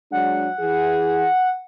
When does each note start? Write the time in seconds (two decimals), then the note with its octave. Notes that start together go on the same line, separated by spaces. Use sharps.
0.12 F#3 G#3 D4 F#5
0.60 E3 G#4